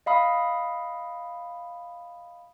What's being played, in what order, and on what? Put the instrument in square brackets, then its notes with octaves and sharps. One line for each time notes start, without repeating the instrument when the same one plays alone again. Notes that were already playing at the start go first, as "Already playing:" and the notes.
[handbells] D#5 F5 B5 D#6